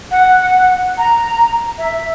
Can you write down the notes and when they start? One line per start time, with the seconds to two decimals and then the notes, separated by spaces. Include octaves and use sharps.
0.11 F#5
0.98 A#5
1.78 E5